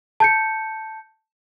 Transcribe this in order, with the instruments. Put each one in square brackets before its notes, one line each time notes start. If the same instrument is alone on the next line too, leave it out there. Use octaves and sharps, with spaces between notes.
[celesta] A5 G6 C#7